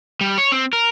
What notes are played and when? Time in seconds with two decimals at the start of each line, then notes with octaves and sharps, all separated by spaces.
0.21 G3
0.38 C#5
0.52 C4
0.73 A#4